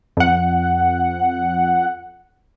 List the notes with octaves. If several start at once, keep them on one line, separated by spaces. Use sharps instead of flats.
F2 F#5